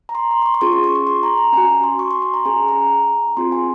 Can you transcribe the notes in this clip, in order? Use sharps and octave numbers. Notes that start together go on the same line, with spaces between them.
A#5
C6
C6
C6
C#6
C6
C#4 F4 G#4 C#6
C6
C#6
C#6
C6
A#5
A#5
C#4 F#4 G#5
C6
C#6
C6
C6
A#5
C#4 G#4 G#5
A#5
C4 F4 G#4 C6
G#5